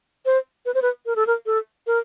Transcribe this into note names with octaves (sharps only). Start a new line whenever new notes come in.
C5
B4
C5
B4
A#4
A4
A#4
A4
A#4